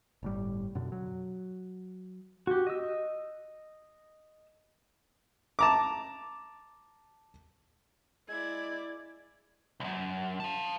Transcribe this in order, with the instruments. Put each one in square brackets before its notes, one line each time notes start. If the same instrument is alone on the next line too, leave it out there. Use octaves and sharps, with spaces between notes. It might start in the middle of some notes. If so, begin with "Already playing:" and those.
[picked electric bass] G1 A2 G3
F#2 B2 D3
F#3
[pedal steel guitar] F#4 G4
D#5 E6
[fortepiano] A5 A#5 D6
[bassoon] G#3 [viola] E4 D5 [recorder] G#6
[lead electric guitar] C2 F#2
F5 A5